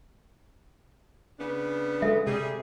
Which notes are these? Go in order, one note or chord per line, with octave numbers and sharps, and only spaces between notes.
C#3 B3 D4
G#3 A4 E5
C3 G3 G#4